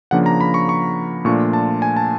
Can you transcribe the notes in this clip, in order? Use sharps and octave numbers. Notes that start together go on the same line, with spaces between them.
C#3 F3 A#3 D4 F#5
A#5
B5
C#6
C#6
A#2 F3 A3 D4 F4 C#6
A5
G#5
A5